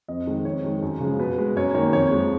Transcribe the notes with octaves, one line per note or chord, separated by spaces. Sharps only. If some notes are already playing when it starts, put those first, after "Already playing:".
F2 D#5
D#3 G#3
F2 C#5
D#3 G#3
F#2
C#3 F3 G#3
B2 B4
G#3
F#2 C#5
D#3 A#3 C#5
F2 C#5
F3 G#3